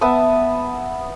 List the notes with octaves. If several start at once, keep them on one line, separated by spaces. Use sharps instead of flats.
B3 E5 A5 D#6